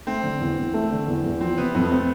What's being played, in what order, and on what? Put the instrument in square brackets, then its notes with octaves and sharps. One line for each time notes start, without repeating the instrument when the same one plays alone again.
[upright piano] A3 [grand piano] C4
[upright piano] D3
E2
E2
A3
D3
E2
E2
[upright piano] F3 [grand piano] C4
[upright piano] C3 [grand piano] B3
[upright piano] F2 [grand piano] B3
[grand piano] A3 [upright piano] C4